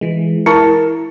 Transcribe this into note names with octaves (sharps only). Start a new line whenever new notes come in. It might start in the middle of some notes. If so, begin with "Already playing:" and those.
E3 G#3
E4 A#4 A5